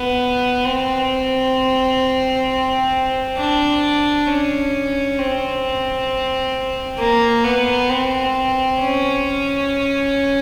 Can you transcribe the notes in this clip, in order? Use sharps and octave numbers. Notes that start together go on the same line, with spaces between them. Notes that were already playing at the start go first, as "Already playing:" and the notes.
Already playing: B3
C4
D4
C#4
C4
A#3
B3
C4
C#4